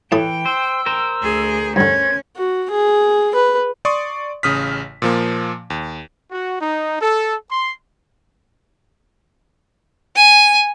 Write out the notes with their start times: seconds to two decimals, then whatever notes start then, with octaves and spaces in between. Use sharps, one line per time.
0.12 A2 E3 A3 G5 D#6
0.45 C5 E6
0.86 A#4 C5
1.22 D2 G#4
1.76 G2 D3 C#4 G#6
2.37 F#4
2.71 G#4
3.35 B4
3.85 D5 C6 C#6 D#6
4.43 A1 C#3 D#6 F6 B6
5.02 A#2 F3 A#3
5.70 D#2
6.31 F#4
6.61 D#4
7.00 A4
7.50 C6
10.16 G#5